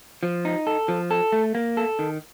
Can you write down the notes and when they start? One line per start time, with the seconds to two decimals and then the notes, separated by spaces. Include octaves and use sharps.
0.23 F3
0.45 D#4
0.67 A4
0.88 F3
1.11 A4
1.32 A3
1.55 A#3
1.77 A4
1.99 D#3